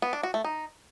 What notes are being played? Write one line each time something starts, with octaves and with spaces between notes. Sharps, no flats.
B3
D4
F#4
A3
D#4